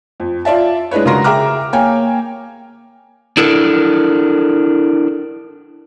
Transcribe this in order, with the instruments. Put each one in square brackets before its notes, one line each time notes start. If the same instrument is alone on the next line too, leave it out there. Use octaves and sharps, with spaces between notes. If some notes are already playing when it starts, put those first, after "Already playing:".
[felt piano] F2
F4 D5 E5 A5
G#3 D4 E4 B4 C#5
C#3 G#3 F#4 A#4 C6 A#6
G#4 E5 G5 A#5 D6 F6
A#3 C#5 G5 G#5
[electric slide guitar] D4 E4 A4 A#4